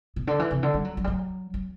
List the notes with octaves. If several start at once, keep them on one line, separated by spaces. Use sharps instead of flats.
B2
D3
E3
C3
D3
G3
F#3
F#3
G3
F#3
F#3